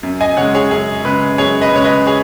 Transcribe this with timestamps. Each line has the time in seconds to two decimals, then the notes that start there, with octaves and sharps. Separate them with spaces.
0.03 F#2
0.21 D#5 G#5
0.37 C#3 G#3 C#5 F#5
0.55 G#4 C#5
0.71 F#2 G#4
1.05 C#3 G#3 B4
1.38 F#2 G#4 C#5
1.61 B4 D#5
1.72 C#3 G#3 C#5
1.84 B4 D#5
2.07 G#4 C#5